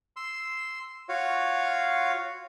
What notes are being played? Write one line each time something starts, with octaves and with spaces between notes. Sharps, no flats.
C6 E6
F4 F#4 C#5 F5